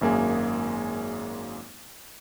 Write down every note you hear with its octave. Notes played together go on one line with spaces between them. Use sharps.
G#1 F#2 A#3 G#4 G#5